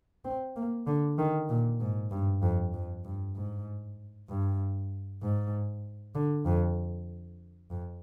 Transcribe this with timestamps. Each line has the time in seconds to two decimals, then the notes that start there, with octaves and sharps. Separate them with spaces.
0.25 C4
0.56 A#3
0.87 D3
1.18 D#3
1.49 A#2
1.80 G#2
2.11 G2
2.43 F2
2.74 F2
3.05 G2
3.35 G#2
4.29 G2
5.23 G#2
6.15 D3
6.46 F2
7.71 F2